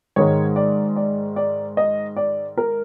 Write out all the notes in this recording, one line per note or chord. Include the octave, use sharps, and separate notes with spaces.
G#2 D#3 G#3 C#5
D5
D5
D5
D#5
D5
A#4